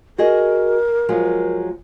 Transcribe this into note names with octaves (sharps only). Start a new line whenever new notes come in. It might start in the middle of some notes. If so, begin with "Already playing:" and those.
F#4 G#4 A#4 D#5
F3 F#3 G#3